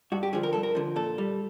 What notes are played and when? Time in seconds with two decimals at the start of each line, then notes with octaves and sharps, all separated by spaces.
0.12 G2 F#4
0.23 G4
0.33 D3 F3 G#4
0.43 A#4
0.53 G2 A4
0.63 A#4
0.75 D3 F3
0.96 A#2 A4
1.18 G3